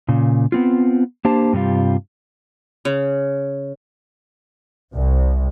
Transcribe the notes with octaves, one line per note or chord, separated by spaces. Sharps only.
A#2 C#3
B3 C4 F4
A#3 D4 G4 C5 A5
G2 C3 G3 F4
C#3
C2